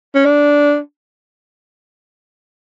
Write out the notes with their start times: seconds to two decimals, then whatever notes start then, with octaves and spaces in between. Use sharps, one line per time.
0.15 C#4
0.25 D4